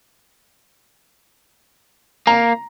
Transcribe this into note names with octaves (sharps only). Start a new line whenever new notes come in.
A#3 A#5